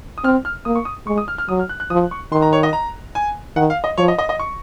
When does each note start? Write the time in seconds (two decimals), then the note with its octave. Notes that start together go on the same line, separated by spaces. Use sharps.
0.18 D#6
0.24 C4 F6
0.45 F6
0.65 A#3 D#6
0.75 C#6
0.85 D#6
1.07 G#3 C#6
1.18 D#6
1.28 F6
1.38 F6
1.49 F#3 D#6
1.59 F6
1.69 F#6
1.80 F#6
1.90 F3 D#6
2.11 C#6
2.32 D#3 C6
2.42 A#5
2.53 C#5
2.63 D#5
2.73 A#5
3.15 G#5
3.56 D#3 F#5
3.70 F5
3.84 D#5
3.98 F3 C#5
4.08 D#5
4.18 D#5
4.29 D#5
4.39 C#6